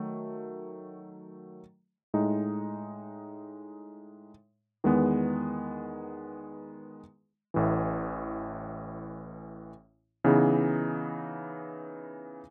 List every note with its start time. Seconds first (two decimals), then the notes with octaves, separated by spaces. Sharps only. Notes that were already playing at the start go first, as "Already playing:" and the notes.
Already playing: D#3 F#3 A3
2.14 A2 G#3 D#4
4.84 E2 D#3 G#3 B3
7.54 A1 A2 E3
10.24 C#3 E3 B3 D#4 G#4